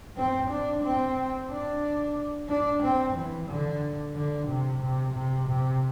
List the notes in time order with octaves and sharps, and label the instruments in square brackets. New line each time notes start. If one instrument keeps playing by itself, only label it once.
[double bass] C4
D4
C4
D4
D4
C4
E3
D3
D3
C3
C3
C3
C3